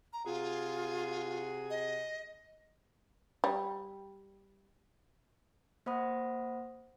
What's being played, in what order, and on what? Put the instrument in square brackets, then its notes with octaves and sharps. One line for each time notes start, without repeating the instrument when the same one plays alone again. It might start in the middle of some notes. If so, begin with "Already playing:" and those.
[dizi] A#5
[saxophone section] C3 F#4 G#4 [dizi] F4
[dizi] D#5
[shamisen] G3
[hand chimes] A#3 C5 F#5 B5 D#6 A#6